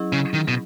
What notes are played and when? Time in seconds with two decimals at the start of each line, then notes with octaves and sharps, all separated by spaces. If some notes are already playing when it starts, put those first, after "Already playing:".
Already playing: F#3 C#4 E4 G#4 D#5
0.13 C#3
0.33 D#3
0.48 B2